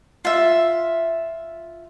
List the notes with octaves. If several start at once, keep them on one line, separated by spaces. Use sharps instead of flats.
F4 E5